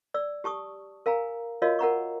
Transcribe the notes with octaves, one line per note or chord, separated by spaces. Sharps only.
D5 E6
G4 A5 C#6 D#6
A#4 F5 G#5 A#5
F4 F#4 A#4 C#5 D#5 F5
A#4 F#5 A#5 C#6